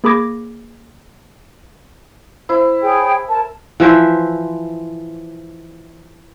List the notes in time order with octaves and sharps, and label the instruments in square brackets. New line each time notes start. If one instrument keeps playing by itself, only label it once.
[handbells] A#3 G#4 B5 D6 G#6 A#6
[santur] E4 [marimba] C5
[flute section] G#4 C#5 G5
A#4 A5
[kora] E3 F3 C5 E5